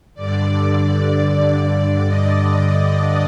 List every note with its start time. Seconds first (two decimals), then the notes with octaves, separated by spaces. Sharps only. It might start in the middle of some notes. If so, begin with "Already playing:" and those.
0.15 G2 D3 D5
2.05 D#5